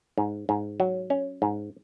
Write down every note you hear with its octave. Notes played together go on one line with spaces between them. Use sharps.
G#2
G#2
F#3
C#4
G#2